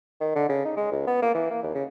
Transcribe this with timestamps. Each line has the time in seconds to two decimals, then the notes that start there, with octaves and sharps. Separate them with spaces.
0.21 D#3
0.36 D3
0.49 C#3
0.65 D#4
0.77 G#3
0.92 C#2
1.07 B3
1.22 A#3
1.35 E3
1.51 A#3
1.63 D#2
1.75 C#3